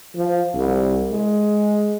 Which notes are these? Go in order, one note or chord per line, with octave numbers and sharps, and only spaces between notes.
F3
C2
G#3